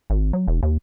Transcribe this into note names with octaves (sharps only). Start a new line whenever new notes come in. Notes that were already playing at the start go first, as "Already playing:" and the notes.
G#1
F#3
E1
D#2